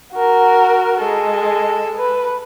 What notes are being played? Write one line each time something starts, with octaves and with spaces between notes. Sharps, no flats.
F#4 A#4
G#3 A4
B4